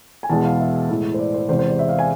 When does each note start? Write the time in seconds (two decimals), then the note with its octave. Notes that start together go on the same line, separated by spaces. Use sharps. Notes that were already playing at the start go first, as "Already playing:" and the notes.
0.23 G#5
0.29 E2 B2 G#3 A5
0.44 F5
0.60 E5
0.89 A2 E3 G#3
1.14 C5
1.19 D5
1.34 C5
1.49 E2 C3 G#3 C5
1.59 C5
1.69 D5
1.79 E5
1.89 F5
1.99 G#5